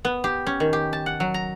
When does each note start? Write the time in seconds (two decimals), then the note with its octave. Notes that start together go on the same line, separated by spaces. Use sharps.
0.05 B3
0.24 G4
0.47 C#4
0.60 D#3
0.73 G4
0.93 A5
1.06 F#5
1.20 F#3
1.34 A#5